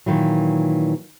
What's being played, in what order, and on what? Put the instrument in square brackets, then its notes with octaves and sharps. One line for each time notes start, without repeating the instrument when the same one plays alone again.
[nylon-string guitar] A#2 D#3 E3 F#3